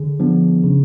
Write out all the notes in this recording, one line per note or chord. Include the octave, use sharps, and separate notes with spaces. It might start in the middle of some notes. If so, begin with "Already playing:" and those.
Already playing: D3 G#4
F3 B3 D4
C#3